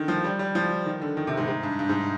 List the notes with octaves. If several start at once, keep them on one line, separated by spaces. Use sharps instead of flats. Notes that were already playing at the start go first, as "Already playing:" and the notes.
Already playing: D3 D#3
F3
G3
G3
F3
D#3
D3
D#3
C3
G#2
G#2
G2
G2
G#2